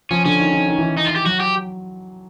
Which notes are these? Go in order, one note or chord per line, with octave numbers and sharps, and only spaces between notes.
F3 C#4
D3 C#4
D#3
D#3
D#3
E3
D#3
D#4
F4
G4
F#3 F#4
G4